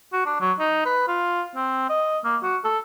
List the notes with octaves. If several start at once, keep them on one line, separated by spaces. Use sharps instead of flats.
F#4
D4
F#3
D#4
B4
F4
C4
D#5
A#3
F#4
A4